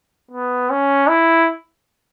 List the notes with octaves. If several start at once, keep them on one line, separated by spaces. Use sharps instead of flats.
B3
C#4
E4